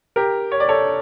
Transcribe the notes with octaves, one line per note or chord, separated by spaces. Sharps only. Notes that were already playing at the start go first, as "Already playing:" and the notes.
G4 A#4
C#5
D5
A4 C#5